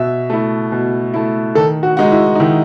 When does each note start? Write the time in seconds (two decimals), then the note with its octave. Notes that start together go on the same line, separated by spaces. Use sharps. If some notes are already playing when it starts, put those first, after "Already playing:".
Already playing: B2 E5
0.30 A3 E4
0.72 B2
1.14 A3 E4
1.55 D#3 A4
1.83 F#4
1.97 G#3 D#4 F#4
2.12 E4
2.35 D#4
2.40 D#3 E4